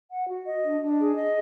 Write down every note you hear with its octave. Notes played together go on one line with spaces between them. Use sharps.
F#5
F#4
D#5
D4
D4
G#4
D#5